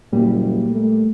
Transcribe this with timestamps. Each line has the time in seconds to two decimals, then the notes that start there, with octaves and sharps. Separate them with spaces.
0.12 F#1 A#2 G3
0.70 A3